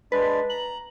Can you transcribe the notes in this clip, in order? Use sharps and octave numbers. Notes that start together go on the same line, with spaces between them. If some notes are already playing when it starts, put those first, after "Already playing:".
G#3 D4 B4 D5
A#5 F#7